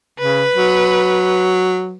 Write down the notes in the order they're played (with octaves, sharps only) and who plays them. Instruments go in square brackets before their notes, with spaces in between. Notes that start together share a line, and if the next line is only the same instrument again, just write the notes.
[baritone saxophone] C#3 [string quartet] B4
[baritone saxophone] F#3